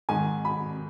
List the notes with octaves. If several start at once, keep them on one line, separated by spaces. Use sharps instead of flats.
G#2 D#3 G#5
B5